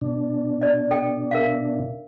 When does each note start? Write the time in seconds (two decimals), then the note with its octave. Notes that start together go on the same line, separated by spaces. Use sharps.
0.01 B2 D4
0.61 D5 D#5
0.91 A4 D#5 G5
1.31 A#4 E5 F5